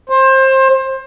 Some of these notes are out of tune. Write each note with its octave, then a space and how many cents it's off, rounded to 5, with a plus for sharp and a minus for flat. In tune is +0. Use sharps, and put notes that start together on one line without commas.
C5 +25